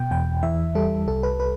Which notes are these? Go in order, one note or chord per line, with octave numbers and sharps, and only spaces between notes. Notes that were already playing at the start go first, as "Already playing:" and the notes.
Already playing: B2 G5
E2 G5
E3 E5
G3 A4
C2 A4
B4
B4